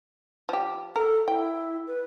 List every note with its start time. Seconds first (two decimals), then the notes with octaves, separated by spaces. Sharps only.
0.49 F3 G4
0.96 A4 A#4
1.28 E4 G5
1.87 B4